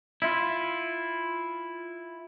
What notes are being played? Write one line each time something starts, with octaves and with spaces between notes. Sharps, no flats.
E4 F4